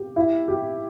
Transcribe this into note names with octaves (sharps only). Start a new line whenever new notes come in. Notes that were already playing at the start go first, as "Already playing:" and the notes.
Already playing: G4
E4
G4